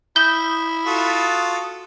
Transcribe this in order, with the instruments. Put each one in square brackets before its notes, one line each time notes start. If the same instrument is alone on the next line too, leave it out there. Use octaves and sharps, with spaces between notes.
[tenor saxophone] E4 [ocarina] D#6 [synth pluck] G6
[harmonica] F4 F#4 A4 [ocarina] D#6